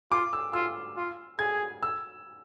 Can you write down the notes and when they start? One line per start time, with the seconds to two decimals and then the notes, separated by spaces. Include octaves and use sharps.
0.12 F4 D6
0.33 E6
0.53 F4 E6
0.97 F4
1.39 G#4 G#6
1.83 E6